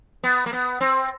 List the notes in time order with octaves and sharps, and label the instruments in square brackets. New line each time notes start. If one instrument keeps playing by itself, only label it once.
[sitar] B3
A#3
B3
C4